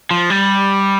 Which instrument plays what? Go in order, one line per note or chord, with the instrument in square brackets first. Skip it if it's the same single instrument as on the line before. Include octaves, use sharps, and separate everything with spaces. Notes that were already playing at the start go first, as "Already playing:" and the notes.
[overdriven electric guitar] F3
G3